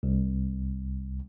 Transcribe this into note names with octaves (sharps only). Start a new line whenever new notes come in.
C2